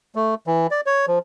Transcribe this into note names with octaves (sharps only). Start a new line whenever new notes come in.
A3
E3
D5
C#5
F3